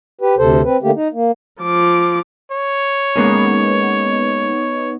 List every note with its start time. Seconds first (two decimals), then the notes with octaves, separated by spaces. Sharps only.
0.21 G4 B4
0.38 D2 C3 A4 C5
0.64 C4 B4
0.83 D3 A3 A#3 G4
0.96 D#4
1.13 A#3
1.62 F3 D6
2.52 C#5
3.16 G#3 A#3 B3 C#4 D#4